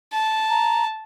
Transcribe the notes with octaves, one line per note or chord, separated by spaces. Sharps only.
A5
A#5